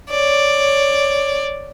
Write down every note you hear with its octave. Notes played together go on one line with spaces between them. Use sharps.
C#5 D5